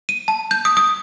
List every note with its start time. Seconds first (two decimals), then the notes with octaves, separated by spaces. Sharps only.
0.09 D#7
0.28 A5
0.51 G6
0.65 D#6
0.77 D#6